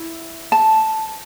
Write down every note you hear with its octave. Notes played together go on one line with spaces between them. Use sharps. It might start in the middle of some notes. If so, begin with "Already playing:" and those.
Already playing: E4
A5